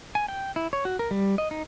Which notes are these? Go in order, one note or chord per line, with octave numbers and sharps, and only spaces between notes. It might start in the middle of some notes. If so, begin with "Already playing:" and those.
G#5
G5
E4
C#5
F#4
A#4
G3
D#5
D#4